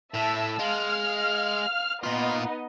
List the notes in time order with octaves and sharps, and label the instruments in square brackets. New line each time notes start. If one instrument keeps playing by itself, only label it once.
[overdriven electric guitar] A2 [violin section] E5 A5 E6
[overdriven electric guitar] G#3 [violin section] F5 F6
[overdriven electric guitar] A#2 F4 [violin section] B3 D#4 D#5